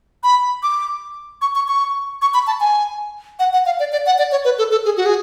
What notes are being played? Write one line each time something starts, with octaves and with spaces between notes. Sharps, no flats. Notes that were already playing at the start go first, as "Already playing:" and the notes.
B5
D6
C#6
C#6
C#6
C#6
B5
A5
G#5
F#5
F#5
F5
D5
D5
F#5
D5
C#5
B4
A4
A4
G#4
F#4
G#4